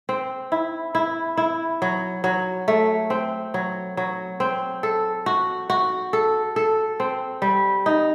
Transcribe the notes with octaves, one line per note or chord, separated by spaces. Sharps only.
C4
E4
E4
E4
F#3
F#3
A3
C4
F#3
F#3
C4
A4
F#4
F#4
A4
A4
C4
G3
D#4